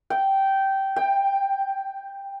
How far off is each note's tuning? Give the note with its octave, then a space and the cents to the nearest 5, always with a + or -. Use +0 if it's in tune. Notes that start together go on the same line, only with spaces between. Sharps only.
G5 -15
G5 +10